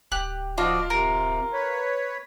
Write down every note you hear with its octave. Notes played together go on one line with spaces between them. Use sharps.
D1 G4 F#6
F3 D4 F4 F#4 D#5 F5
C3 A#4
B4 C#5